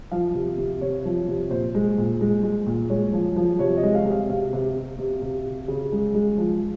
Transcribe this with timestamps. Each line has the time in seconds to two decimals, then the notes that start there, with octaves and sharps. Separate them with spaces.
0.11 F3 F5
0.35 C3
0.58 C3
0.81 C3 C#5
1.05 F3
1.28 C3
1.51 A#2 C5
1.75 G#3
1.98 A#2
2.21 G#3
2.43 G#3
2.67 A#2
2.90 G#3 C#5
3.13 F3
3.36 F3
3.59 C3 C#5
3.77 D#5
3.83 G#3
3.95 F5
4.06 C3
4.12 F5
4.29 C3 F5
4.53 C3
4.76 C3
4.99 C3
5.22 C3
5.46 C3
5.68 C#3
5.92 G#3
6.14 G#3
6.38 F3